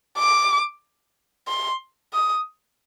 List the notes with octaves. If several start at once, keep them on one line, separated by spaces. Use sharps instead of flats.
D6
C6
D#6